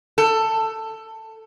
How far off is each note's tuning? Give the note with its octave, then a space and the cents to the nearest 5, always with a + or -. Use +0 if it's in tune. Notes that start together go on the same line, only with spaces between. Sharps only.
A4 +10